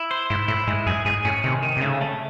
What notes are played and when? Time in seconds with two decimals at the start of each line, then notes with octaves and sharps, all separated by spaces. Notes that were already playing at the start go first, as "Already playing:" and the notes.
Already playing: E4
0.11 C5
0.30 G#2 E4
0.48 A2 E4
0.67 G#2 G#3
0.87 F#2 G#4
1.05 G#2 G#4
1.25 A2 C#4
1.44 C3 D#3
1.63 D#3
1.77 C3
1.81 C#3 A3
2.01 A3